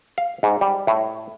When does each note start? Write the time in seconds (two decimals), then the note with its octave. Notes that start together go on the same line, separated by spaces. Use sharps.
0.18 F5
0.43 G#2
0.61 G3
0.87 A2